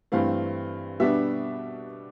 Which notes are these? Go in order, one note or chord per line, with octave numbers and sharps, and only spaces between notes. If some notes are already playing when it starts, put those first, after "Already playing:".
G2 E3 A3 C4 F5
B2 G3 B3 D4 E5